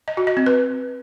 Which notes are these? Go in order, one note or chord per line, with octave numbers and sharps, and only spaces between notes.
D#5
F#4
D#5
C4
B4